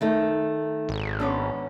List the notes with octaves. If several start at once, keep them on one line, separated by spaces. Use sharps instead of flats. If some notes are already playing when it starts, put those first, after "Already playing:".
D#3 A3 D#4
G#1
B3 C#4 D4